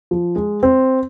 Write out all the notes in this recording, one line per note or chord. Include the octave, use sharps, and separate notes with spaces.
F3
G#3
C4